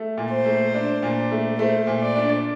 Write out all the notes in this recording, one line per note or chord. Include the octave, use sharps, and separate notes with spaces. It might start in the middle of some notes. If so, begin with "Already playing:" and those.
Already playing: A3
A#2
C5
A3
D4
A#2
A3
A3 C5
A#2
D5
D4